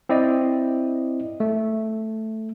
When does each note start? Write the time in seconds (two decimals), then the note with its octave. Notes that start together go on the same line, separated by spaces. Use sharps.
0.09 C4 E4 D5 D#5
1.40 A3